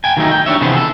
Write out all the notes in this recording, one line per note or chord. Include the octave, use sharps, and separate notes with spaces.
G5 G#5
D#3 F#3 G3 A3 D#4
G5
G3 D4 D#4 C#5 E5
C3 D#3 E3 B3 G#4 C5
A4